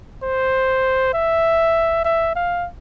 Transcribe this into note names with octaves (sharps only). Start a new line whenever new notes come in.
C5
E5
E5
F5